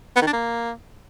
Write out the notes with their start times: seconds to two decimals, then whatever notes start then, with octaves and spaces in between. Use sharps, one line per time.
0.16 B3
0.22 D#3
0.27 D4
0.33 A#3